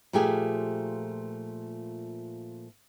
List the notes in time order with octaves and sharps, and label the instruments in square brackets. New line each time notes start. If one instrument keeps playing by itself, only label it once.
[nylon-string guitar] A#2 F3 A3 G4 G#4